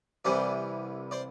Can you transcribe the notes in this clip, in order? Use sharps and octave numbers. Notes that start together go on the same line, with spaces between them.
C2 C3 E3 G3 C5 D5
C5 D5